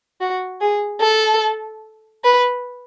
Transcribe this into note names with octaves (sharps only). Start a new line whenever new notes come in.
F#4
G#4
A4
B4